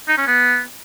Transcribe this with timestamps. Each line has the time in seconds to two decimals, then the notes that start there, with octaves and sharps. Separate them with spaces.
0.08 D#4
0.17 C#4
0.26 B3